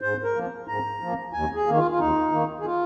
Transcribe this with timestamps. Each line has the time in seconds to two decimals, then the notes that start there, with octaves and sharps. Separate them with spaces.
0.02 G#2 C5
0.24 A#4
0.35 F3 A#3
0.67 G#2 A#5
1.01 F3 A#3
1.33 D#2 G#5
1.55 G#4
1.66 D#3 A#3
1.77 F4
1.91 F4
1.99 D#2 D#4
2.32 D#3 A#3
2.60 G#4
2.65 F4